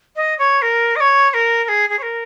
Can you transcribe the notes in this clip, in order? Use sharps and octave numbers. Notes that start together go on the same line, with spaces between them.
D#5
C#5
A#4
D#5
C#5
C#5
A#4
A#4
G#4
G#4
C#5
A#4